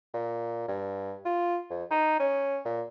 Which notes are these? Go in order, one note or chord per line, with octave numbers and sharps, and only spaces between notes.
A#2
G2
F4
F2
D#4
C#4
A#2